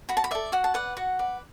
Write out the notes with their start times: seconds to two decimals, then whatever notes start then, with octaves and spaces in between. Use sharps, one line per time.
0.09 F#4 B5
0.17 A5
0.24 B5
0.31 A4 D5 E5
0.52 F#4 F#5
0.64 A5
0.74 B4 D5 F#5
0.97 F#4 F#5
1.19 B4 D5